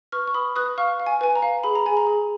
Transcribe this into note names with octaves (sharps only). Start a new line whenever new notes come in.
B4 C#6 F6
C#6
B4 B5 D#6
B4 D#6 F#6
F5 C#6 F6
F5
G#5
B4 G#5
A#5
F5
G#4 B5
A#5
G#4 G#5
A#5
G#4